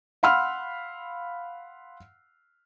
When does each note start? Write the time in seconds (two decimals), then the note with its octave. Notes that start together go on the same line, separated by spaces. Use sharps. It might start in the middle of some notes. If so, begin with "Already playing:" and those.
0.23 F5 F#5 B5 C6 E6 F6